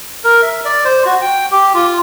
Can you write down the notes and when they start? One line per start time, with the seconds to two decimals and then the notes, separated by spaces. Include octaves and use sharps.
0.24 A#4
0.42 E5
0.65 D5
0.85 C5
1.05 F#4
1.21 G5
1.51 G4
1.74 F4